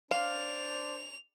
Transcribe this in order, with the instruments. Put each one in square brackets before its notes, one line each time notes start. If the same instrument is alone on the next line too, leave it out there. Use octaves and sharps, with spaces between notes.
[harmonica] D4 C5 [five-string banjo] F5 [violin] F7